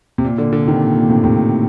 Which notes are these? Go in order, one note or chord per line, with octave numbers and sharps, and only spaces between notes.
C3
A#2
A#2 D3
A#2 D3
C3 D#3
A#2
A#2
A2 C3
A2 C3